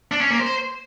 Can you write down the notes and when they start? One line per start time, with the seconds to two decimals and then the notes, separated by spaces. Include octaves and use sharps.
0.12 D4
0.21 C#4
0.30 A#3
0.40 C5